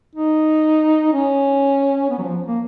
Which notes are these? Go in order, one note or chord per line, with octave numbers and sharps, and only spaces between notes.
D#4
C#4
B3
F#3
F3
A#3